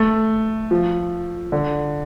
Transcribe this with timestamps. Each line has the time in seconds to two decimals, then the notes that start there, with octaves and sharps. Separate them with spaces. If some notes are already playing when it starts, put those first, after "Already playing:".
Already playing: A3
0.71 F3
1.52 D3